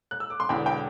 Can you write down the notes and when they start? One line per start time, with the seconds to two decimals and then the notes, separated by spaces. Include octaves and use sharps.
0.11 F#6
0.20 E6
0.30 D6
0.40 C6
0.49 E1 E2 D3 G5 B5
0.66 G5 B5